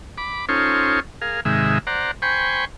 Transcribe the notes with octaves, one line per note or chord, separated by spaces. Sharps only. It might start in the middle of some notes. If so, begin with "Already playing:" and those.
B5 D6
C#4 D#4 F4 A4 C5 C#5
G#4 A#4 F5
G#2 C3 D#3 G#3 E5
C5 D5 F#5 A#5
C5 G5 G#5 B5 C#6